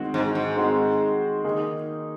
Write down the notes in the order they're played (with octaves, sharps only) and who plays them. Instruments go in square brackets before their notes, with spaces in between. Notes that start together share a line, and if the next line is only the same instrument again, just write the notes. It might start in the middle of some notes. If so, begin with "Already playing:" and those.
Already playing: [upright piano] D#3 G#3 C4 F#4
[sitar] G#2
G#2
[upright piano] D#3 G#3 C4 F#4
D#3 A#3 D#4 G#4